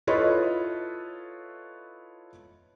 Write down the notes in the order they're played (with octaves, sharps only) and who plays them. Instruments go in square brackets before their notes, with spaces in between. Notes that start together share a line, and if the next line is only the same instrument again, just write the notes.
[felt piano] E4 F4 A4 B4 C#5 D#5